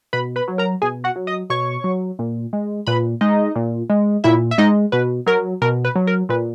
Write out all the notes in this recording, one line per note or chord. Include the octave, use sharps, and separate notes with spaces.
B2 B4 B5
B4 B5
F#3
A#4 A#5
B2 G#4 G#5
F#4 F#5
F#3
D#5 D#6
B2 C#5 C#6
F#3
A#2
G#3
A#2 B4 B5
G#3 D#4 D#5
A#2
G#3
A#2 E4 E5
E5
G#3 D#4 D#5
B2 B4
F#3 A#4
B2 A#4
B4
F#3
A#4
A#2 B4